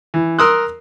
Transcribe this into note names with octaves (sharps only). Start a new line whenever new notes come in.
E3
A#4 C6 D#6 E6 F#6